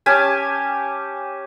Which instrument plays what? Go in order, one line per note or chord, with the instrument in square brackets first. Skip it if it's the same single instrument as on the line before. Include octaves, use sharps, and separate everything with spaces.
[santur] C#4 G4 G#5 A5